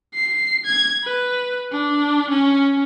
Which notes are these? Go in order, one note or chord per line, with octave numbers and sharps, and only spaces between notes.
C7
G#6
B4
D4
C#4